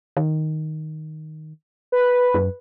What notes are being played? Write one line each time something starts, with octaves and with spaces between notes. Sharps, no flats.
D#3
B4
F#2